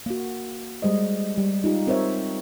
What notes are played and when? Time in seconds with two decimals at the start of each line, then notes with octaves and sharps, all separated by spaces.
0.06 A#3 F#4
0.82 G3 G#3 C5 D#5
1.38 G3
1.64 D#4 F4 G4
1.87 C4 A#4 C5 C#5 E5